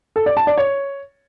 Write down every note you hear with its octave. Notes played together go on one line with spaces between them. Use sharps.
A4
D5
A5
D5
C#5